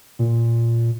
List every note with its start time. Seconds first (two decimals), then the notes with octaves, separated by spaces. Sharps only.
0.19 A#2